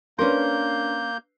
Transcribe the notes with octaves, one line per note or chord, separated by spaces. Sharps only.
A#3 C#4 D4 A#4 B4 C6 G6